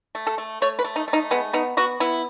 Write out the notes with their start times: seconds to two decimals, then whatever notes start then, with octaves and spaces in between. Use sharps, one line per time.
0.15 A3
0.27 A4
0.38 A3
0.62 A3 C#5
0.79 B4
0.84 A3
0.96 D#4
1.08 A3
1.13 D#4
1.31 G#3 B3
1.53 B3 D#4
1.77 B3 F#4
2.00 B3 E4